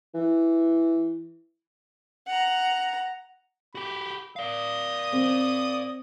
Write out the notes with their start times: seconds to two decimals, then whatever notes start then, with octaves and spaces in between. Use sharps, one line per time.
0.14 E3
2.27 F#5 A#5
3.75 F#4 G4 B5
4.36 D5 F5 D#6
5.13 C4